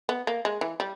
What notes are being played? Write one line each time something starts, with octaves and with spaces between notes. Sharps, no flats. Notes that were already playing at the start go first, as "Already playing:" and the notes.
B3
A#3
G#3
E3
G3